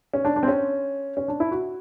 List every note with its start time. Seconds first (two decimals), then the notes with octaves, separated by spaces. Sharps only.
0.14 C#4
0.25 D4
0.36 D4
0.43 C4
0.48 C#4
1.17 C#4
1.28 D4
1.40 E4
1.51 F#4